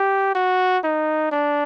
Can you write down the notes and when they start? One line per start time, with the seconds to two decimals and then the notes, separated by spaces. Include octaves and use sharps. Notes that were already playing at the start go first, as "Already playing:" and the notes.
Already playing: G4
0.35 F#4
0.84 D#4
1.32 D4